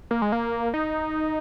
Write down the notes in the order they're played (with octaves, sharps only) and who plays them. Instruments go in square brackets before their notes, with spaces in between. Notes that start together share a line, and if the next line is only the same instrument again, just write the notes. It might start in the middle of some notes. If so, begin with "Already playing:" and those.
[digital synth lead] A#3
G#3
A#3
D#4